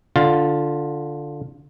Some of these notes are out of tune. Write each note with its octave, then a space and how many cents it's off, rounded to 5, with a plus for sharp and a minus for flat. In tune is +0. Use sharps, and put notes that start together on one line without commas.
D3 +0 F4 +10